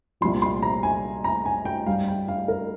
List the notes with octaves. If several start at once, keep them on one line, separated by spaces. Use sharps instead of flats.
C2 A#2 F3 C6
C6
A#5
G#5
A#5
G#5
G5
G2 G3 F5
G5
F5
A#4